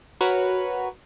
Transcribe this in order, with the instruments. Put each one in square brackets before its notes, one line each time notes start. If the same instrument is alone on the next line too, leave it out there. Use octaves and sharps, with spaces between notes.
[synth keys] F#4 A#4 B4 C#5 B5